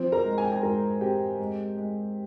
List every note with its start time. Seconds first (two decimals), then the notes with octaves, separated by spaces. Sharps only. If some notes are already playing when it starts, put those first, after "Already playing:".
Already playing: F3 C4 C5
0.12 A#4 A#5
0.25 G#3
0.38 G#5
0.45 G5
0.52 G#4 G#5
0.63 G#2 A#4 A#5
1.01 C4 G4 G5
1.39 G#3
1.77 G#3